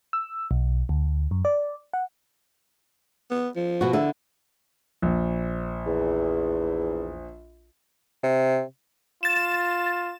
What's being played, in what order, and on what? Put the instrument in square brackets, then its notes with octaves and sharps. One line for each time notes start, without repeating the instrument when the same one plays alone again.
[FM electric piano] E6
B1
D2
F#2
D5
F#5
[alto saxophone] B3
F3
[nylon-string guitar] B2 F#4
D3 E4
[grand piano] A#1
[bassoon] E2
C3
[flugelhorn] F4 [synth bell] A6 E7